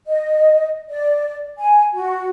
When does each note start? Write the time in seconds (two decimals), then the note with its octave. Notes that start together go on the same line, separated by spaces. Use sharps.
0.07 D#5
0.90 D5
1.59 G#5
1.95 F#4